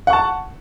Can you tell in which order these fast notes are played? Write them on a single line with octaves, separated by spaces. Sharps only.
F#5 C#6 A5